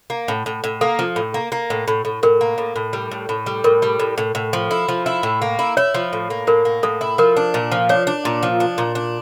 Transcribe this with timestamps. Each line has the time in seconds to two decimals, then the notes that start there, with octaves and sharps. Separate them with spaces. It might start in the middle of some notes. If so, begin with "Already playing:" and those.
0.10 A#3
0.28 A2
0.46 A2
0.64 A2
0.81 A#3 A4
0.99 F3
1.16 A2
1.34 A#3
1.52 A#3
1.70 A2
1.88 A2
2.05 A2
2.23 A2 A#4
2.41 A#3
2.58 A2
2.76 A2
2.93 G3
3.11 A2
3.29 A2
3.46 G3
3.64 A2 A#4
3.82 G3
4.00 A2
4.18 A2
4.35 A2
4.53 F3
4.71 E4
4.89 F3
5.06 E4
5.23 A2
5.42 A#3
5.59 E4
5.77 E4 C#5
5.94 F3
6.13 A2
6.30 A#3
6.47 A2 A#4
6.65 A#3
6.83 A2 A4
7.01 E4
7.18 F3 A#4
7.37 D4
7.54 A#2
7.72 F3
7.89 D4 C#5
8.07 D4
8.25 A#2
8.43 F3
8.60 D4
8.78 A#2
8.95 D4